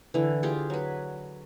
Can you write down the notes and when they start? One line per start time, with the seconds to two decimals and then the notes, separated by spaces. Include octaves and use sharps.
0.14 D3 E3
0.43 F4 G4 G#4
0.70 F#3 B4